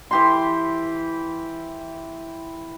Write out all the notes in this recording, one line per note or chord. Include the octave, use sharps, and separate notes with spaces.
E3 G4 C6